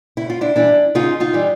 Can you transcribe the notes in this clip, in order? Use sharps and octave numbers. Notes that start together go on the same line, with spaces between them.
C#3 E4
F4
D4 E4
E3 G3 D4 E4
C#3 D#4 F4
D#4 F4
E3 G3